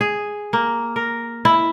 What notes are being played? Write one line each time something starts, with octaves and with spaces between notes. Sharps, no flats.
G#4
A#3
A#4
E4